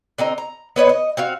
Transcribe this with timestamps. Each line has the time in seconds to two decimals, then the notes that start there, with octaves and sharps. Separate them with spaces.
0.18 D3 C4 D#5 A#5
0.38 A#5
0.76 B3 B4 C#5 D#5
0.89 D#5
1.17 C4 F#4 F5